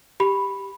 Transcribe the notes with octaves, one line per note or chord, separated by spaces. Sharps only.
G4 B5